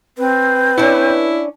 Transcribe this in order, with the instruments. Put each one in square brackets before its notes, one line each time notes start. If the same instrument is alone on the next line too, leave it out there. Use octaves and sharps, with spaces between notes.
[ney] C4 [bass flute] B4
[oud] C#4 D4 [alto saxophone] E4